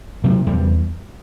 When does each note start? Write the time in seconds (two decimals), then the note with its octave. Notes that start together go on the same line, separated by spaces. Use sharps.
0.24 C3 F#3
0.46 E2 G3